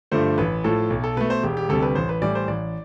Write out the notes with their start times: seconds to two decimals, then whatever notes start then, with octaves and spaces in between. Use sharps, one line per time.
0.11 G2 D3 F3 A3 C5
0.38 A1 B4
0.64 A2 F3 A4
0.90 B1
1.04 A4
1.17 B2 A3 B4
1.30 C5
1.43 E1 G4
1.57 G4
1.69 D2 C3 G3 A4
1.82 B4
1.95 A1 C5
2.09 B4
2.21 A2 E3 G3 D5
2.35 C5
2.48 A1 D5